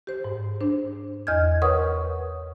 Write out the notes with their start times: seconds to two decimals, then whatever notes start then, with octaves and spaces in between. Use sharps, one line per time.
0.07 G4 C5
0.24 G#2
0.61 D4 C5
1.27 E2 D#5 F6 G6 G#6
1.62 A#4 B4 C#5 F#5 C#6 D#6